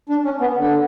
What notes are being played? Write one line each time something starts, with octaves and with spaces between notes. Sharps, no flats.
D4
C#4
B3
D3